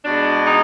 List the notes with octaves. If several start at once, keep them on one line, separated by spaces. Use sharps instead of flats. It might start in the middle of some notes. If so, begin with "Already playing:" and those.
B2 G#3 D4
D#4